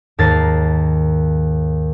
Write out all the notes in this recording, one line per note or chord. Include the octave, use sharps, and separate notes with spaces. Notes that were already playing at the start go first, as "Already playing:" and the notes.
D#2 G#2 A#4 A5 A6 C7